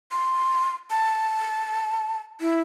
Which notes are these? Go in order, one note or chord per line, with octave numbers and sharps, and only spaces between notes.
C6
A5
E4